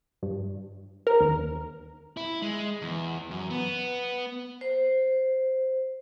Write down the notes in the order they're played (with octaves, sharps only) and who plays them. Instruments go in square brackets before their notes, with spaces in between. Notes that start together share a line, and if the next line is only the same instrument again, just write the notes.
[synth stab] G2
A#4
D#2
[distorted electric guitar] E4
G#3
E2
F#2
B3
[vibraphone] C5